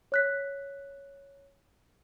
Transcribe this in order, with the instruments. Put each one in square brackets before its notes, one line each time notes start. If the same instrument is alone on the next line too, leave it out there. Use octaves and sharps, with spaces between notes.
[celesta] C#5 F#6 B6